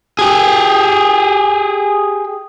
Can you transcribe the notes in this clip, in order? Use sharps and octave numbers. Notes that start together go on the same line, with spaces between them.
G4 G#4